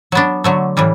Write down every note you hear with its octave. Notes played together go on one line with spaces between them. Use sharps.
F#3 B3 D4
D3 F#3 A3
A2 E3 G3